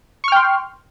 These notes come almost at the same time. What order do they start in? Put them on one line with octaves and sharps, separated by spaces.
C#6 F6 G5 C6